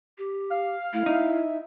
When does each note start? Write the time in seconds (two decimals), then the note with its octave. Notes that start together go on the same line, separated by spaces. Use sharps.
0.18 G4
0.51 F5
0.93 A3 E4
1.06 D#4 E5